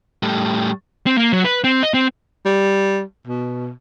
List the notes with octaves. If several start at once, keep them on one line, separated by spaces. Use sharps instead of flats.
A2 G3
C4
A#3
F#3
B4
C4
D#5
C4
G3
B2